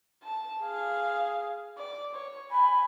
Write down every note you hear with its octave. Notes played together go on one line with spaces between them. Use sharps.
A5
G#4 F5
D5
C#5
G#5 B5